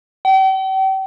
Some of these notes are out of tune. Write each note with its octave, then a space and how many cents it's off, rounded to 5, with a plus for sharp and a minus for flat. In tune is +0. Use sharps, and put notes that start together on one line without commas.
G5 -40